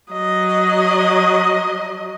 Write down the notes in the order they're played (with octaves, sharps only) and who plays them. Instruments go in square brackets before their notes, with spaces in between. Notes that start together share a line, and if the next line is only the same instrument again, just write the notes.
[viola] F#3 D#5